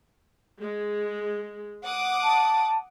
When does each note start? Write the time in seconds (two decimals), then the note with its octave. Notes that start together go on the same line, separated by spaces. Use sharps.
0.61 G#3
1.83 F#5 D6 D#6
2.22 A5